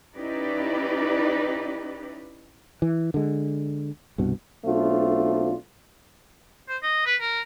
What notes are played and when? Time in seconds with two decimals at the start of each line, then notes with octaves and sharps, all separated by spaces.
0.16 C#4 D#4 E4 G4 B4 D5
2.82 E3
3.14 D3 G#3
4.18 C2 G2 B2
4.65 B1 A3 C4 D4 F4
6.69 C5
6.83 D#5
7.06 B4
7.21 A#4